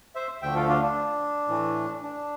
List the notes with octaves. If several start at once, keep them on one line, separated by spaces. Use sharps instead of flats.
C5 E5
D2 D3 F3 A3 E5 G5
F4 A4
D4 F4
D4
A2 E3 A3
D4